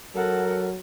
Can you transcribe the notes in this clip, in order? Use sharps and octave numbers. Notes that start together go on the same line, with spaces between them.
F#3 A4 A#4 F#5